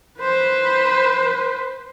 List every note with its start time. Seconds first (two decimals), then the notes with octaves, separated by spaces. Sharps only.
0.19 B4 C5